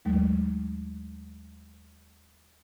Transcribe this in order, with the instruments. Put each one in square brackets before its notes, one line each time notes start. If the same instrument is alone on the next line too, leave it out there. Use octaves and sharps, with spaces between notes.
[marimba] D#2 F#3 G#3 A3